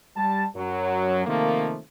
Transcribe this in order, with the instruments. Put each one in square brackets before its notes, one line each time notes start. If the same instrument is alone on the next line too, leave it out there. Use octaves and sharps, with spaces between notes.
[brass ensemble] G3 A5
F#2 F#3
C3 D#3 F3 A3 A#3